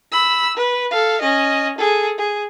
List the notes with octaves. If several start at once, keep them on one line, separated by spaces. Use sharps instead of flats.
B5 E6
B4
A4 F5
C#4 D#5
G#4 A4
G#4